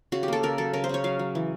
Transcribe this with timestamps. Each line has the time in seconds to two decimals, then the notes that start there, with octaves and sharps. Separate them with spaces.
0.12 C#3 F#4
0.23 G4
0.28 A#3 A4
0.43 C#3 A#4
0.58 F#3 A4
0.73 C#3 A#4
0.84 C5
0.89 C#3 C#5
1.04 F#3 F5
1.19 F#3
1.35 E3